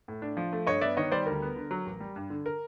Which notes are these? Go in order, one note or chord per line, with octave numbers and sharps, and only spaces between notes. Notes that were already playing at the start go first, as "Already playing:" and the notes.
A2
D4
F3
A3
G2 C#5 D#5
B3 D5 E5
D#3 C#5 D#5
G3 C5 D5
D2 A#4
B3
D3
F#3
A1
G3
G2
D3
A#4